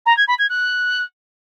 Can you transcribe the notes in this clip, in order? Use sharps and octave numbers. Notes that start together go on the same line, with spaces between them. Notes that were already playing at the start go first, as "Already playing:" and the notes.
A#5
G#6
B5
G#6
F#6